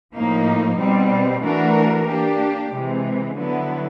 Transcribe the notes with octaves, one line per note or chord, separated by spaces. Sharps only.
A2 F3 A#3 D#4
B2 G3 C4
E3 A3 D4 F#4 A#4
A#3 D4 G4
C3 E3 G#3
D3 F#3 B3 E4